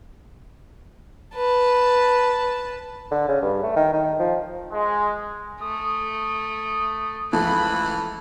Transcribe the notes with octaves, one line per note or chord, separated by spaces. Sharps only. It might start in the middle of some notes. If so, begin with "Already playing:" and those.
B4 A5
D3
C#3
G2
A3
D#3
D#3
F3
G#3
A3 D#6
C#2 E3 F3 A3 A5 B5